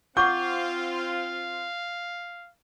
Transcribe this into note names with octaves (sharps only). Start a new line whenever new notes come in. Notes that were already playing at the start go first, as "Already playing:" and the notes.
C4 F4 F5 F#5 C#6 D6 G6